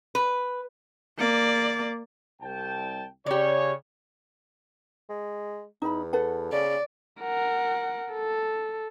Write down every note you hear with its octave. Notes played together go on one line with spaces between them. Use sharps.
B4
A#3 D5
C2 G5 A5
C#3 G4 C#5 D5
G#3
E2 D#4 B5
A4 B4 F#5
C#3 D5
A#4 F#5
A4